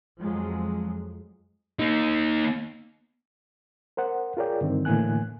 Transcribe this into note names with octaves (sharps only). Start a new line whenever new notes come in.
F2 F3 F#3 G#3
A#3 D#4
A#4 C5 F#5
F4 G#4 A#4 C#5 D5 G5
G2 D3 D#3 C4
A2 D3 E3 A#3 G#5 F#6